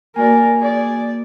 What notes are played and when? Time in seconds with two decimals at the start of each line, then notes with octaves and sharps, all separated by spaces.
0.16 A#3 F#4 A#4 D5 G#5
0.61 G#4 D5